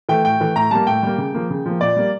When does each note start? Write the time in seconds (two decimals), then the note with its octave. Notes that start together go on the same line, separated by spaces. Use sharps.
0.09 E3 A3 G5
0.24 A2 G5
0.40 E3 A3
0.56 A2 A#5
0.71 G3 A#3 A5
0.87 A2 G5
1.03 G3 A#3
1.18 C#3
1.35 F3 A#3
1.50 C#3
1.66 F3 A#3
1.81 A#2 D5
1.96 G3 A#3